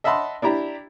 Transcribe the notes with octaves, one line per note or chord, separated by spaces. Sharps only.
D#5 E5 F#5 A5 B5 C6
D4 E4 G4 A#5